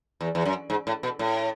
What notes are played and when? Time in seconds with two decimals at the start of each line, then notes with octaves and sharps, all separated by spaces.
0.21 E2
0.35 E2
0.45 F#2
0.70 G#2
0.87 A2
1.03 B2
1.19 A2